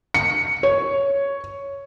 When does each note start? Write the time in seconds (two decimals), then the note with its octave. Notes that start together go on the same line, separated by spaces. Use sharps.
0.14 C#7
0.63 C#5